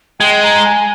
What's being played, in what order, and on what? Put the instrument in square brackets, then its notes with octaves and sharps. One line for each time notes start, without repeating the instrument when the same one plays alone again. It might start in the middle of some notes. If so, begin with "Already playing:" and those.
[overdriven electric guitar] G#3 [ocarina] G5
[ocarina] A#5
G#5